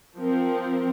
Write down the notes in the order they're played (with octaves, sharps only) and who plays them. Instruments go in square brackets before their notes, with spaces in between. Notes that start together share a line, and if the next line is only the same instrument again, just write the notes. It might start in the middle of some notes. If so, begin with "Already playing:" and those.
[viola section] F3 C4 A#4